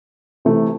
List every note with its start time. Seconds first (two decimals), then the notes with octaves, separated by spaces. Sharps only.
0.45 C3 E3 A3